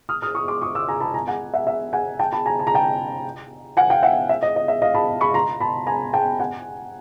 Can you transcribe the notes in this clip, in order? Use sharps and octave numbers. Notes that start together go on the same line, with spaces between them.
D#6 F6
D#6 F6
C#6 D#6
C6 D6
C#6 D#6
D6 E6
G#5 A#5
A5 B5
G#5 A#5
F#5 G#5
E5 F#5
E5
F#5 G#5
G5 A5
A5 B5
G#5 A#5
A5
A#5
G5 A5
F#5 G#5
F5 G5
E5 F#5
E5
D#5
D#5
E5
D#5 F5
A5 B5
B5 C#6
A#5 C6
A5 B5
G#5 A#5
G5 A5
F#5 G#5